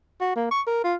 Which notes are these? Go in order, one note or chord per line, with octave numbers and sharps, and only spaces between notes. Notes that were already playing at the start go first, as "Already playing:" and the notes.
F#4
A#3
C#6
A#4
F4